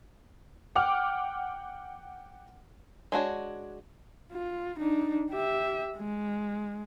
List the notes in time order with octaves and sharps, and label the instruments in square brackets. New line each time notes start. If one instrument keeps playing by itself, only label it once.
[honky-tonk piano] F#5 G5 D6 F6
[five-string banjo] G#3 D4 F#4 C#5
[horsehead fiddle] F4
D4 D#4
G4 E5
G#3